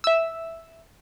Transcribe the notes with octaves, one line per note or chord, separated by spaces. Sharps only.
E5 E6